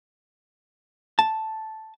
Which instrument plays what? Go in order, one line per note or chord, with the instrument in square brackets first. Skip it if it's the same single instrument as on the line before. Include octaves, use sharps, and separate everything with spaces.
[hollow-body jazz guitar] A5